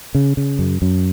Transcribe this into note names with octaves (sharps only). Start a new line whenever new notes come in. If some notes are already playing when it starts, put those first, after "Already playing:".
C#3
C#3
F#2
F#2